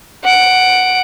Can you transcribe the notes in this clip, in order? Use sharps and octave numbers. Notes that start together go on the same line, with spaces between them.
F#5 D7